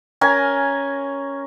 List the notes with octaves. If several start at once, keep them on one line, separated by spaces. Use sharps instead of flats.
C#4 A#4 G#5